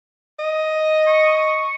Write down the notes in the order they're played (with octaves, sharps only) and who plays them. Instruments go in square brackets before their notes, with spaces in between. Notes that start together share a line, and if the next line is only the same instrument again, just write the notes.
[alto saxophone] D#5
[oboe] C#6